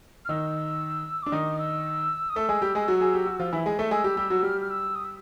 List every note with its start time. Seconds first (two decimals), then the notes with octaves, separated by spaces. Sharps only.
0.25 F6
0.29 D#3 D#4 E6
1.22 D4 D6
1.32 D#3 D#4 D#6
1.58 E6
2.29 D#6
2.36 A3 A4 E6
2.49 G#3 G#4
2.62 G3 G4
2.75 G#3 G#4
2.88 F#3 F#4
3.01 G#4
3.14 G4
3.26 F#4
3.39 F3 F4
3.53 E3 E4
3.66 G#3 G#4
3.79 A3 A4
3.91 G#3 G#4 E6
4.04 G3 G4
4.17 G3 G4
4.30 F#3 F#4
4.43 G3 G4 F6
4.61 F6
4.70 E6
4.95 D#6
5.04 E6